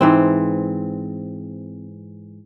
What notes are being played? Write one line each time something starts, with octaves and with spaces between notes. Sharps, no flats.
G#2 E3 C4